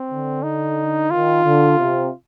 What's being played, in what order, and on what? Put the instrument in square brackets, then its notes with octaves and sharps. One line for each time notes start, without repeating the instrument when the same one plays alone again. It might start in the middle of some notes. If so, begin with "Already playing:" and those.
Already playing: [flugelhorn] C4
[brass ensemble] D3
[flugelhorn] D#4
[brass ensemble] D#3 [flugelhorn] F4
[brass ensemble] D3
C3